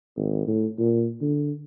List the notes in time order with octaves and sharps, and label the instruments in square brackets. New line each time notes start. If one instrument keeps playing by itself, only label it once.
[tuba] G#1
A2
A#2
D3